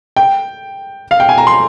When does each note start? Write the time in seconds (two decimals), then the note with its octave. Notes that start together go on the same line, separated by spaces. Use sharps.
0.17 G5
1.11 F5
1.20 G5
1.29 G#5
1.38 A#5
1.47 C6